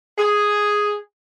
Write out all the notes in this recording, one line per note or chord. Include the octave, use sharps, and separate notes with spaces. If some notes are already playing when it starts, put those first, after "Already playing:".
G#4